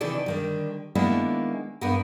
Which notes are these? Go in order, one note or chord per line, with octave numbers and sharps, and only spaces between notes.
C3 D#3 E3 A4 D5
D3 D#3 G3
D#3 G#3 A#3 B3 D4 E4
G2 B3 A#4